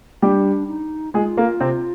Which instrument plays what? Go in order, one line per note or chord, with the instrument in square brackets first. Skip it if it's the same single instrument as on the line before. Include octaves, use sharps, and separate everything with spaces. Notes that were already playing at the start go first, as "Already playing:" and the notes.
[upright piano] G3 G4 [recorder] D4
[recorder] D#4
[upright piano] G#3 G#4 [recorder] F4
[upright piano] A#3
C3 C4